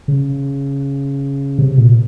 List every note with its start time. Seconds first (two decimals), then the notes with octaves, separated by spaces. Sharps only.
0.08 C#3
1.59 C3
1.78 A#2